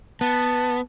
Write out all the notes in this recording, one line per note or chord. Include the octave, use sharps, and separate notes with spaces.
B3 A5